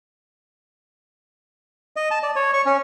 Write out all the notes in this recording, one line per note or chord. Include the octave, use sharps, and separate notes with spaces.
D#5
A5
D5
C#5
C#6
C#4